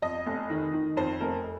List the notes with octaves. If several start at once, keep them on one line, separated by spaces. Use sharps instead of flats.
F2 D#5
F1
D#3
D#3
F2 C5
F1 A#4